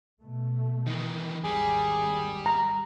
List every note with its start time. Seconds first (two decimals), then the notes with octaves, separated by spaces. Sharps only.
0.20 B2 A3
0.87 D#3 E3
1.44 G#1 D#2 G3 G#4
2.46 A#5